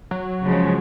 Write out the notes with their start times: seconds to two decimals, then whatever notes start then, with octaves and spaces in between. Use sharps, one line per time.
0.11 F#3
0.44 C#3 F3 G#3